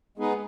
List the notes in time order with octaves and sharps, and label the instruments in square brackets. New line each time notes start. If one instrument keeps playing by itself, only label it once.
[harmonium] G#3 B3 D#4 G#4 B4